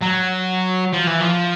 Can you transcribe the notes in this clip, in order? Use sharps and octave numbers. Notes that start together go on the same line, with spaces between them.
F#3
F3
E3
F3